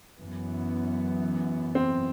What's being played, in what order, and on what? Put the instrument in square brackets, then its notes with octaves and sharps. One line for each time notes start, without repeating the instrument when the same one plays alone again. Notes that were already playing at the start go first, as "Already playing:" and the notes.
[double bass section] F#2 E3 B3
[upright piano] C4